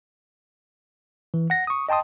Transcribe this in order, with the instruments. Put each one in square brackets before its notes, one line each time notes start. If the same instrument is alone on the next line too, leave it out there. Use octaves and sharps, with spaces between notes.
[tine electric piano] E3
F#5 A#6
C#6 D#6
D#5 G5 A5 C6 D#6